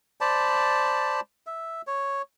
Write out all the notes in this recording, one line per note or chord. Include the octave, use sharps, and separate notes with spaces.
C5 D5 A5 B5
E5
C#5